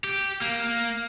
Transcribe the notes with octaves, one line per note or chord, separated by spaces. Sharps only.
G4
A#3